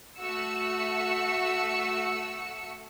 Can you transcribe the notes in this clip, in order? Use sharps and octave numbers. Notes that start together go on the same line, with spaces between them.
A3 F#4 E6 C#7